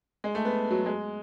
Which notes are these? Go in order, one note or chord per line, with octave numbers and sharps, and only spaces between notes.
G#3
A3
B3
F#3
G#3